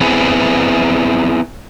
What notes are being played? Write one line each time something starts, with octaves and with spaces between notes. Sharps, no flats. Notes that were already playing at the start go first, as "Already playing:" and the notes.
B3 C4 E4 G#4 B4